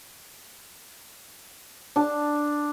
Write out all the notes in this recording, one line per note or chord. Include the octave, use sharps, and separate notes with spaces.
D4 A5